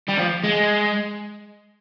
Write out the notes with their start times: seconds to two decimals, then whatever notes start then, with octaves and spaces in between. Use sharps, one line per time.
0.08 G3
0.18 F3
0.44 G#3